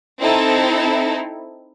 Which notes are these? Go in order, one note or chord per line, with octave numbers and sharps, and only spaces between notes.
C4 D#4 E4 A4